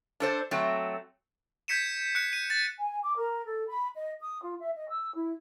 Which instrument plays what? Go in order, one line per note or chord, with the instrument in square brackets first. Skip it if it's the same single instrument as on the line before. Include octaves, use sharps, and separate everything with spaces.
[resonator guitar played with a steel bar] D4 A4 C5
F#3 A3 C4
[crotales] G6 G#6 B6 C#7 D#7 E7
F#6 C#7
D#7
A6
[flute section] G#5
D6
A#4
A4
B5
D#5
D#6
F4
E5
D#5
E6
E4